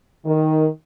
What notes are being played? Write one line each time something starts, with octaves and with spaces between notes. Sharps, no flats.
D#3